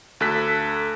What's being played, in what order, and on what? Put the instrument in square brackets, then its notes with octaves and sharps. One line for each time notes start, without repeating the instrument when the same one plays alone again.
[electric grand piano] D2 A4 F#6 B6